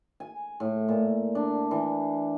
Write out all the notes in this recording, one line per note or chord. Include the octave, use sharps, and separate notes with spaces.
G#5
A2
A#2
D4
E3